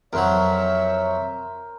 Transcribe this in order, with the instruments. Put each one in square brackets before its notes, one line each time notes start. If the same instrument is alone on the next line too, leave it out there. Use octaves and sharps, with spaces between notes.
[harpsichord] F2 F#3 [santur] A#4 C5 [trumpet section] C#5 [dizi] E5